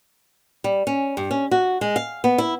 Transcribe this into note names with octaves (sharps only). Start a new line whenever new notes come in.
G3
C#4
G2
C#4
F#4
G#3
F5
B3
E4